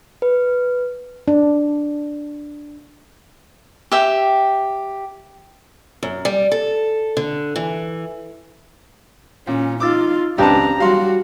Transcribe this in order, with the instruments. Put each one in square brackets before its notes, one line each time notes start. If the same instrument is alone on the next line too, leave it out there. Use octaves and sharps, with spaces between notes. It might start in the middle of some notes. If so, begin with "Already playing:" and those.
[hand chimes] B4
[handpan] D4
[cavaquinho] G4 E5 G5
[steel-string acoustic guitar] F#2
G3
A4
D3
E3
[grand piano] A#2 [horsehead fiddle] C#4
[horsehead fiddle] D#4 F4 [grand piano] D6 E6 A6
[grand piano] C#2 B4 A5 [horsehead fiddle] C4 A#5 [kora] D4 G4
[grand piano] F#3 F5 C6 [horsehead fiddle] G3 F#4